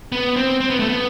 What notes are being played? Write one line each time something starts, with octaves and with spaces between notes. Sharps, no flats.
B3
C4
C4
B3
A3
B3